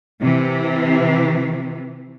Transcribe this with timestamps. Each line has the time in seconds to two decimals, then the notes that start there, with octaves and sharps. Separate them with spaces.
0.22 C3 E3